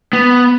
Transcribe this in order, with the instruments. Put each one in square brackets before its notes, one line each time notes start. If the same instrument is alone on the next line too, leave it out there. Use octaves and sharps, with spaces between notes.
[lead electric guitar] B3